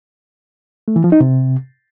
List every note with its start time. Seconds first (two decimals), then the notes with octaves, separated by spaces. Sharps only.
0.88 A3
0.96 E3
1.04 F3
1.12 D#4
1.20 C3